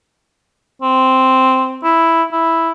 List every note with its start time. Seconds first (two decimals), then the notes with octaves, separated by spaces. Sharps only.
0.82 C4
1.83 E4
2.32 E4